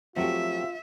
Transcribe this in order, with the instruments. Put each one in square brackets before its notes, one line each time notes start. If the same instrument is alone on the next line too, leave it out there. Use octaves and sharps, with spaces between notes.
[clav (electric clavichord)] F3 F#3 A3 [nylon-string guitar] C4 G4 [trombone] F4 [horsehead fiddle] E5